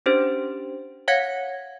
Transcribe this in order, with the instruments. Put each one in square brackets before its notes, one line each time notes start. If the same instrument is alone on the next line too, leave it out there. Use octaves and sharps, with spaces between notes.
[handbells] C#4 D4 G4 C5
C#5 F5 F#5 G#6 A#6 C#7